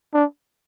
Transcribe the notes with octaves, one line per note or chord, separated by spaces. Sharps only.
D4